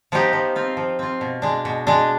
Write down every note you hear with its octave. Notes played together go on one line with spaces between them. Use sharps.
F3 B3 D#4 G4
F3
C4 F4
F3
C4 F4
B2
G#3 D4
B2
G#3 D4